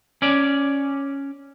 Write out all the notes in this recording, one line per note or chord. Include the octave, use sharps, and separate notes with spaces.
C#4 D5